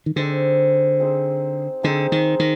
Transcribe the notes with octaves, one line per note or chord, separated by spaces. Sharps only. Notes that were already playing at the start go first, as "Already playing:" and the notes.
D#3
D3 C4 D#4 G#4 C5
C4 D#4 G#4 C5
D3 C4 D#4 G#4 C5
D#3
D#3